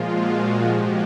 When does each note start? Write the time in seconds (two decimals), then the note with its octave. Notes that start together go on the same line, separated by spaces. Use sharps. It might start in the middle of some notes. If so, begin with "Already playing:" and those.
Already playing: A#2 F3 G#3 F4
0.08 F#4
0.63 G#2 F3 G#3 G4